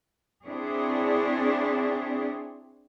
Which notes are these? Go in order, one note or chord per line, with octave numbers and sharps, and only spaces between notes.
C4 D4 E4 G#4 C#5